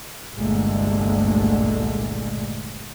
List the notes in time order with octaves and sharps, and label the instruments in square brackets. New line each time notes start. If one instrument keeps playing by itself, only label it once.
[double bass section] G1 C2 A#2 D3 G#3 A3